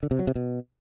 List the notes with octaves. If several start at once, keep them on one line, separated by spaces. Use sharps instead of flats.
D3
C3
F#3
C3
B2